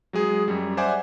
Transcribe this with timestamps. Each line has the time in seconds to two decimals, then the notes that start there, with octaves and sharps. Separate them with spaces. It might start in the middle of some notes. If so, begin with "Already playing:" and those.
0.13 F#3 G#3 G#4
0.48 F#2 G3
0.77 C5 D5 E5 F#5 G#5 D6